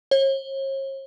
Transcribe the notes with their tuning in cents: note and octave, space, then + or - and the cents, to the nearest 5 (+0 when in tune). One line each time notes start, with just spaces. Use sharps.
C#5 -45